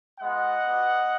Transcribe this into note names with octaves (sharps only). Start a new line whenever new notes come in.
G#3 B3 F4 D#5 F#5
B3 D4 F#4